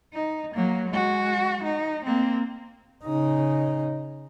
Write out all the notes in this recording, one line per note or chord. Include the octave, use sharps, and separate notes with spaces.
D#4
F#3 A#3
G#3 F#4
D#4
A#3 C4
C#3 D#4